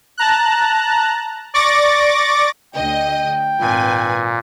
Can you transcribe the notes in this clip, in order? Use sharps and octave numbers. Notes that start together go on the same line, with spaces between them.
A5 A#5 F#6
D5 C#6 D6 A6 A#6
D2 D3 D#5 G5
G#1 A#2 B4 G#5